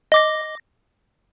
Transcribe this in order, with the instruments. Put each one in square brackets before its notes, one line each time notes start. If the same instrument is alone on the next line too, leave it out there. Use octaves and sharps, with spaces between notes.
[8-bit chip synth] D#5 D6 A#6